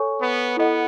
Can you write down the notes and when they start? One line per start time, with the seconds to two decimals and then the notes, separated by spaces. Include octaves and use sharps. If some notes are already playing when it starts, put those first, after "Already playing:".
Already playing: A4 C#5 G#5 C#6
0.19 B3
0.57 B3 E4 A4 D#5 F#5